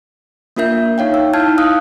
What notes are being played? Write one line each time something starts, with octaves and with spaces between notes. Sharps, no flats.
A#3 D4 F4 A#4 E5 G6
D#4 C#5 F5 G5
E6
D#4 E4 A5 F6 G6 G#6
F5 D#6 E6 F#6